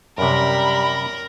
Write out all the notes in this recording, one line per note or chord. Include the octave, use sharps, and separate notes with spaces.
F#2 C3 G3 A#4 B5